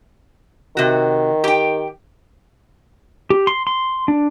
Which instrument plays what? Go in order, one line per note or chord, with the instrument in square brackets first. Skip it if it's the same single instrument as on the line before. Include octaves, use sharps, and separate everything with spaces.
[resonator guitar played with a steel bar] C3 F#4 [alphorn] D#3
[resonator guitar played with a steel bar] G4 G5
[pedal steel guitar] G4
C6
C6
D4